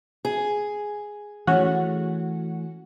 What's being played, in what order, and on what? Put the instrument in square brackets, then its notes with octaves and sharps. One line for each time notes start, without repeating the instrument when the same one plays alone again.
[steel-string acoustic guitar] G#4
[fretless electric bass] E3 A3 [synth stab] C#4 F#4 F#5